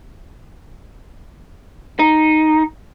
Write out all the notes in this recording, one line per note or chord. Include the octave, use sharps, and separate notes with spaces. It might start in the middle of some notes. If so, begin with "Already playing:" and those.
D#4